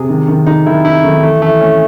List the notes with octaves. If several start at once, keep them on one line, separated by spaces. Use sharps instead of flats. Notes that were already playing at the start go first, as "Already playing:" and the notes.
Already playing: C3 G#4
D#3
D#3
D#4
D#3 E4
D#4 E4
D#3 A3
E3 A3
E3 A3
A3 C#4